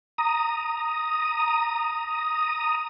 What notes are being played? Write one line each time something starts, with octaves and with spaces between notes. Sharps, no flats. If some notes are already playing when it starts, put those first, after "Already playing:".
A#5 D#6